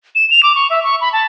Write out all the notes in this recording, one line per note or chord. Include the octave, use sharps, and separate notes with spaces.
E7
F7
D6
C#6
E5
C#6
B5
A5